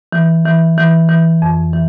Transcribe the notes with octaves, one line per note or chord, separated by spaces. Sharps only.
E3
E3
E3
E3
F2
E3